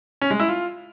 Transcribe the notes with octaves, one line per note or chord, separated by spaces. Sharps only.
C#4
G#3
E4
F4